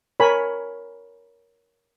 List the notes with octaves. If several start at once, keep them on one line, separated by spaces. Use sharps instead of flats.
A#4 C#5 G#5 B5